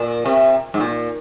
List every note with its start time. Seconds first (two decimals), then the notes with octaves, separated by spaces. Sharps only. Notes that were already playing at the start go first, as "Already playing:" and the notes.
Already playing: A#2
0.26 C3
0.74 G#2
0.80 A#2